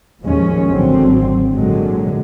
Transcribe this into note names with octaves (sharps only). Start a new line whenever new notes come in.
D#2 A#2 F3 G#3 C#4
G#1 D3 F#3 C4
A#2 D3 F#3 G#3